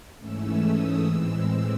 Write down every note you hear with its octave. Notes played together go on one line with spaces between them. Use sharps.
G#2 E3 A3 C#4 E6
D#6
A2 E3 G#3 C4 E6